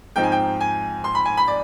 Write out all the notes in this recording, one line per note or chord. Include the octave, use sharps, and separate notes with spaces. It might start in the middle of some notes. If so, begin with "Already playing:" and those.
G#2 F3 C4 D#4 G5
G#5
G5
G#5
C6
B5
G#5
B5
D5